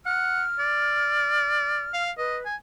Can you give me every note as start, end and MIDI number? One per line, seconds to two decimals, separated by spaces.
0.06 0.42 78
0.06 2.08 89
0.59 1.87 74
1.93 2.11 77
2.18 2.44 71
2.18 2.37 75
2.45 2.55 80